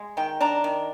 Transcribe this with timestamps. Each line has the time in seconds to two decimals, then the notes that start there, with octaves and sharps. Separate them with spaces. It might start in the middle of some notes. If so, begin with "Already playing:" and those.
Already playing: G#3
0.17 D#3 G5
0.41 D4 A#5
0.64 D#3